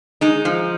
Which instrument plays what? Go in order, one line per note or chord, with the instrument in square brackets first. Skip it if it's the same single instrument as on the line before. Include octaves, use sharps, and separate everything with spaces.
[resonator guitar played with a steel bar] G#3 D#4
F3